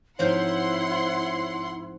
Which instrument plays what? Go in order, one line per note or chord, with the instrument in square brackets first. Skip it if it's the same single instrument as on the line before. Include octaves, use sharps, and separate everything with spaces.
[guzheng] G#2 F3 C4 [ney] E4 [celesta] C#5 G6 [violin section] F#5 C6